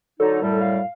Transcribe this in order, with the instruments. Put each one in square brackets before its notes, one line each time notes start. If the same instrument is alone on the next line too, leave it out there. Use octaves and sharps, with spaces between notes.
[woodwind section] D3 F#3 D#4 [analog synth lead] A4
[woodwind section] F#2 A2 G3
[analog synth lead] F5